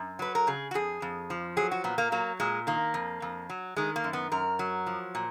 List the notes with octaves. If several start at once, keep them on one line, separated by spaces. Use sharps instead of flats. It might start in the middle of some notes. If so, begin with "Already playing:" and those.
Already playing: F#2
F#3 B4
A#4
C#3 G#4
F#4
F2 G#4
F2
F3
F#3 G#4
F#4
A#2 B3
A#3
F#3 A#3
A#2 G#3
D#3 A#3
F2
F2
F#3
D#3 G#3
A#3
F#2
B3
F#2 A#4
F#3
F3
A#2